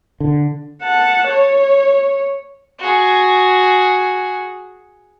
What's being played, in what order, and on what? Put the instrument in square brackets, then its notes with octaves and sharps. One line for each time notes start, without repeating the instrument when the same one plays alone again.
[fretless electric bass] D3
[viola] F#5 A5
C#5
[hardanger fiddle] F#4 G#4